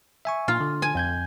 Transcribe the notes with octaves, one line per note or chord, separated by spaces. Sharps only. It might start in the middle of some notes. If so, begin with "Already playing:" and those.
E5 G#5 C#6
A#2 F4
D3
G#5
F2 G6 G#6